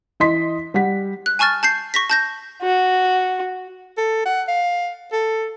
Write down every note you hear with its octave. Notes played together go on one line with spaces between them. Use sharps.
E3 D#5 C6 B6
G3 F#5 B6
F#6
G#5 A5 C#6 F6 A6
A5 G6 C7
C#6 A#6 B6
A5 G6 A#6
F#4
A4
F#5
F5
A4